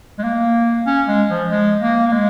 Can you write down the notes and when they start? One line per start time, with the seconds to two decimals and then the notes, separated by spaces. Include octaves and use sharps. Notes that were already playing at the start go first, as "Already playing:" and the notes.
0.18 G#3
0.24 A#3
0.87 C#4
1.08 G#3
1.30 F3
1.50 G#3
1.81 A#3
2.08 A#3
2.12 G#3